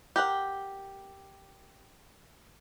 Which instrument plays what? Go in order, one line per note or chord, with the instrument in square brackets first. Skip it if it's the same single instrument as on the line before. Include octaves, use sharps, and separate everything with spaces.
[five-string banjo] G4 A#4 F#5 G5